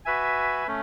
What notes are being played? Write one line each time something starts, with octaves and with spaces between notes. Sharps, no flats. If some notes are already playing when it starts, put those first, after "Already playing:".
F#4 B4 E5 G#5
A3 C#4